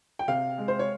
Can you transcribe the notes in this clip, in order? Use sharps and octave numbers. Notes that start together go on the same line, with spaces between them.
G5
C3 F5
G#3
C5
C#5